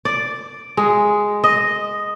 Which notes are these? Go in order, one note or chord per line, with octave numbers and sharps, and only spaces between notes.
D5
G#3
D#5